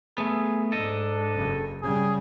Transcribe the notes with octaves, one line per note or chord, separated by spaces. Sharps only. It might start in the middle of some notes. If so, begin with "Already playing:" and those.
A3 B3 G#4
G#2 D4 A4 D#5
F#1 C#3
C#3 G3 G#4